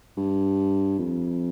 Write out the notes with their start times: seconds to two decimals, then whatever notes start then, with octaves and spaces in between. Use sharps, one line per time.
0.17 G2
0.99 F2